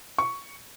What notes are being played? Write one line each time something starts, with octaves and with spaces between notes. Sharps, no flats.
C#6